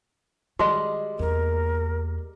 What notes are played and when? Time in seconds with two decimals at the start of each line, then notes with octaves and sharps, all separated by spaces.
0.59 D#3 G3 G#3 F#4 D#5
1.19 E2 A#3 A#4